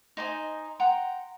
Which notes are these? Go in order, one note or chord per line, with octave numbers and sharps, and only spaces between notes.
D#4 C5 D#5 G#5
F#5 G5 A#5 C6